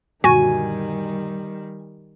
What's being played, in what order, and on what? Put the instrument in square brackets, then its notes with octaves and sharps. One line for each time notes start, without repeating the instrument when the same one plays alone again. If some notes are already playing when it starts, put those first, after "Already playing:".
[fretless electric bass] F#2 A#2 D3 [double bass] D#3 G3 [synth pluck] F#4 [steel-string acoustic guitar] G#5